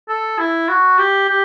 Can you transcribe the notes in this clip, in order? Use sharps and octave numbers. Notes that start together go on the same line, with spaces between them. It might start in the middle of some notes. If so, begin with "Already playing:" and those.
A4
E4
F#4
G4
G4